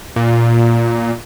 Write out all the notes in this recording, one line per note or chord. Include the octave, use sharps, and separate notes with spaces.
A#2